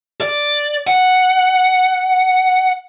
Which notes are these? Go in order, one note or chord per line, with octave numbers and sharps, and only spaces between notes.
D5
F#5